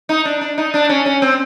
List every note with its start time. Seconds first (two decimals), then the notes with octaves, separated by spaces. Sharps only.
0.09 D#4
0.25 D4
0.41 D4
0.58 D#4
0.74 D4
0.89 C#4
1.06 C#4
1.22 C4